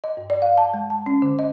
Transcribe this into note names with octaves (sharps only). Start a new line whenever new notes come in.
D#5
G2
D5
F5
A5
G#3
A5
C#4
D3
D#5